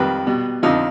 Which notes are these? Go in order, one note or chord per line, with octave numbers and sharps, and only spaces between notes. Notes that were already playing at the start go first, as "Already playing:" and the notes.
Already playing: F2 D#3 G3 B4
B2 G3
F2 D3 F3 D#4